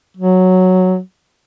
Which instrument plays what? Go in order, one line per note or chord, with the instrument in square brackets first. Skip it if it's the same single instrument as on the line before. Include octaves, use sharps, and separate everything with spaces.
[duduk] F#3